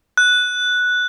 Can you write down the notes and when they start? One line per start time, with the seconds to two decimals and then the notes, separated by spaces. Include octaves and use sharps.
0.17 F#6